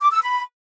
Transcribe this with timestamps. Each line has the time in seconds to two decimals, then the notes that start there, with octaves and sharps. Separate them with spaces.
0.01 D6
0.12 E6
0.22 B5